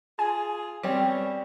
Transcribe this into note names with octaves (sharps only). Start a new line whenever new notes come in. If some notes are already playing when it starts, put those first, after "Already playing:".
F4 G#4 G#5
B2 G3 C4 C#4 C#5